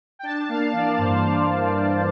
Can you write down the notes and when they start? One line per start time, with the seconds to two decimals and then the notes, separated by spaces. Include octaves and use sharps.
0.19 G5
0.23 D4 A5
0.49 A#3 F5
0.73 E3 D5
0.98 G2 C5
1.08 D5
1.17 C5
1.24 D4 D5
1.35 C5
1.44 D5
1.48 A#3 C5
1.62 D5
1.71 E3 C5
1.80 D5
1.89 C5